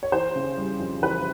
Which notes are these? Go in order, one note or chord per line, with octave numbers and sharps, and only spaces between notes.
C#5
E3 C5
C#3
G3
F2
E3 B4